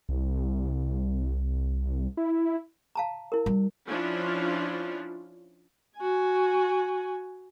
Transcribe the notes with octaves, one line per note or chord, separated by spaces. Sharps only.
C2
E4
F5 A5 A#5
E4 A#4
G3
F3 C#4 D4 E4 F4
F#4 G#5